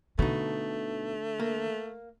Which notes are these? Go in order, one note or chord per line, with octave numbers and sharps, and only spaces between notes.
B2 D3 A3 D#4
A#3